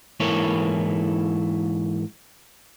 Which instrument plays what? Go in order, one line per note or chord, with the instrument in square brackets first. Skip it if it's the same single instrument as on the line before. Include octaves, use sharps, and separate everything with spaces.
[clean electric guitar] G#2 E3 A#3 E4 A4 C#5